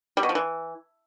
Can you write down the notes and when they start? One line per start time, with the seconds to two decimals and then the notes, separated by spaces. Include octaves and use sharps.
0.17 G3
0.23 B2
0.29 F3
0.35 E3